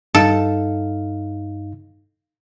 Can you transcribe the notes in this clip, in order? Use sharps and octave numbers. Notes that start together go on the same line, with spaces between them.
G2 D#4 A4 F5